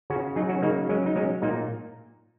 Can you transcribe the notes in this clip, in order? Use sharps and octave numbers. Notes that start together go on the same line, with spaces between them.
C#3 C#4 F#4
F#3 D#4 G#4
C#4 F#4
C#3 A#3 D#4
F#3 G#3 C#4
D#4
G#3 C#4
A#2 A#3 D#4